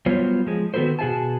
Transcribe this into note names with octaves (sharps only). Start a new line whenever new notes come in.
F#3 G3 B3 F4 C5 C#5
F3 G#3
D#3 B3 F#4 A4 B4 C5
B2 F#4 G#4 F5 G#5 A5